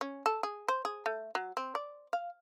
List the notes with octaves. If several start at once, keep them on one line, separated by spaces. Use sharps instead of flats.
C#4
A4
G#4
C5
G#4
A3
F#3
C4
D5
F5